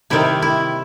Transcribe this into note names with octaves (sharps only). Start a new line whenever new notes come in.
C3 D#3 G3 E4
E4